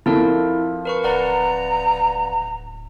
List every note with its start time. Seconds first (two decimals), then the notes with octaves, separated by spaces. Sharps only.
0.06 F2 F3 E4 A4 A#4
0.85 A#4 B4 C#6
1.04 D1 B4 D5 F#5 A#5